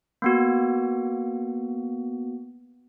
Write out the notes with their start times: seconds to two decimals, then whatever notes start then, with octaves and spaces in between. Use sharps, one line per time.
0.22 A#3 B3 F#4